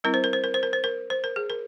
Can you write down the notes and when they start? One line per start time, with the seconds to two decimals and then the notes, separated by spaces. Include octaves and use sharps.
0.04 G3 C4 E4 A#4
0.14 C5
0.24 A#4
0.33 C5
0.44 A#4
0.54 C5
0.63 A#4
0.73 C5
0.84 A#4
1.10 C5
1.24 A#4
1.36 G#4
1.50 A#4